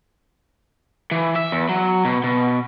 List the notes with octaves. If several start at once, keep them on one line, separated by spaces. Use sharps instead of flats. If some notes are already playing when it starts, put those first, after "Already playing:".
E3
E5
E2
F#3
B2
B2